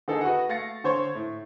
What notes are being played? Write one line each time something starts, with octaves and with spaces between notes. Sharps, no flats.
D3 D#4 G#4 A4
F#4 B4 D#5 F#5
A3 F5 A6 A#6 C#7
D3 C5 C#5 C6 C#6
A2